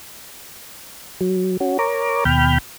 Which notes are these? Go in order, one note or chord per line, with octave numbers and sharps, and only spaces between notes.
F#3
C#4 F#4
A#4 C#5 A#5 D6
D#2 B2 G5 B5 F6 G6